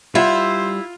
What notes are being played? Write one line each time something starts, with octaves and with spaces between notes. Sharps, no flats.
G3 E4 F4 C5 E5 F#5